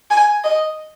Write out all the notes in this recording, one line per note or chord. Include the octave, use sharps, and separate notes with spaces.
G#5
D#5